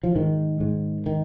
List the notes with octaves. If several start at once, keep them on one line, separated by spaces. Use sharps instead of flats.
F3
G#2 D#3
G#2
D#3